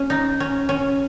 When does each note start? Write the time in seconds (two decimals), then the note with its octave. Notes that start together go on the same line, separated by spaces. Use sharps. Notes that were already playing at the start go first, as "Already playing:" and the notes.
Already playing: C#4
0.10 D#4
0.40 C#4
0.69 C#4